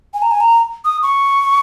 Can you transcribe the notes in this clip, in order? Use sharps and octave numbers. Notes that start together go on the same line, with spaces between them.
G#5
A#5
G#5
A#5
D#6
C#6